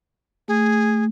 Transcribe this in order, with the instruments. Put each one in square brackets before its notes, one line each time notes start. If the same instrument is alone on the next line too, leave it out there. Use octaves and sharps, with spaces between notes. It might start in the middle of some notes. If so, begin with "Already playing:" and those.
[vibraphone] A3 [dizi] G#4